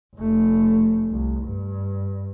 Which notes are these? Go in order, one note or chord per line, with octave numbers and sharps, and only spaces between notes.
F1 A3
C2
G2